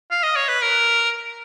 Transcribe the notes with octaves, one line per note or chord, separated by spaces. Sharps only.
F5
D#5
C#5
B4
A#4